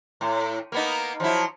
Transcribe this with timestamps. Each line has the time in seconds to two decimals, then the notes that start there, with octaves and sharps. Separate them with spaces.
0.21 A2
0.72 A#3 B3 D#4
1.20 F3 F#3 E4